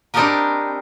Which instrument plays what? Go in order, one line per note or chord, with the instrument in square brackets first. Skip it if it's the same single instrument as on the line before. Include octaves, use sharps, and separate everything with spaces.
[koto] C4 D4 D#4 G4 A#4 B4